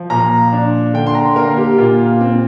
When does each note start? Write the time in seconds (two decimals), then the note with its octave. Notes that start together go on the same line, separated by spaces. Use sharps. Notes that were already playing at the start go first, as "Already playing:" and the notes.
Already playing: F3
0.10 A#2 A#5
0.53 D4
0.93 D3 G5
1.07 C6
1.15 A#5
1.36 A#3 A#4
1.57 G4
1.78 A#2 F4
2.21 C4